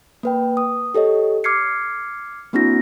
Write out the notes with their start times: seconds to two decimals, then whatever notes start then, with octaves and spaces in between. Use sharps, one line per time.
0.23 A#3 B4 G5
0.57 D#6
0.94 G4 A4 C#5 D#5
1.44 D6 F6 G#6 C7 C#7
2.53 A#3 C4 D4 E4 F#4 A#6